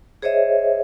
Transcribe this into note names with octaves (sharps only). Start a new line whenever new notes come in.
G#4 C5 C#5 D#5 E5